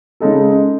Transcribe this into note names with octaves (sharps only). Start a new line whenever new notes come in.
C#3 G#3 D#4 A4